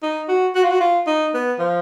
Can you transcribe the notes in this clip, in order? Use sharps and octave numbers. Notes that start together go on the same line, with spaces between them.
D#4
F#4
F#4
F4
F#4
F4
D#4
B3
F3